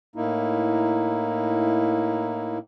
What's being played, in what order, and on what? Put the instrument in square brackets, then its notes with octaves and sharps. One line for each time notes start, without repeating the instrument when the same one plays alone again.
[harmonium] A2 A#3 D#4 E4